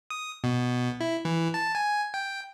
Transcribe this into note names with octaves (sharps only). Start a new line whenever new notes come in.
D#6
B2
E4
E3
A5
G#5
G5